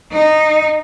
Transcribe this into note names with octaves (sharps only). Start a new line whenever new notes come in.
D#4